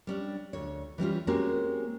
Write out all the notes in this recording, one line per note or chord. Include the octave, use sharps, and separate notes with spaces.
G3 C#4 D4
D2 C#5
E3 G3 C#4 F4
G#3 A#3 C4 C#4 F#4 G4